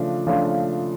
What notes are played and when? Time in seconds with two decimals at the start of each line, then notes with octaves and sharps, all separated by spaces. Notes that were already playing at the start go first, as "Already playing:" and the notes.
Already playing: C#3 F3 A3 D4 F4
0.27 C#3 F3 A3 D4 F4